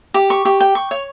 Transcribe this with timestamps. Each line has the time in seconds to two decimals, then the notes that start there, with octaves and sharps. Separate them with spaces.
0.14 G4
0.30 C#6
0.45 G4
0.60 G5
0.75 C#6
0.91 C#5